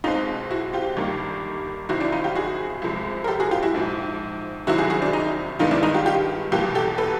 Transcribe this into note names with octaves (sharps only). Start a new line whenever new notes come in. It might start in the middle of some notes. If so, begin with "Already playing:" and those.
B1 B2 G#3 C4 D#4 F4
E4 F#4
F4 G4
G1 G2 D#3 G3 A#3
C2 C3 D#3 E4 F#4
D4 E4
D#4 F4
F4 G4
F#4 G#4
C2 C3 F3 G#3
A#4
G4 A4
F#4 G#4
F4 G4
E4 F#4
A#1 G#2 F3
C2 C3 D#3 F#3 E4 F#4
F#4 G#4
F#4 G#4
D4
D#4
G2 D#3 G#3 B3 D#4 F4
D4 E4
D#4
F4 G4
F4 G4
E2 B2 G3 A#3 F4 G4
G4 A4
A4 B4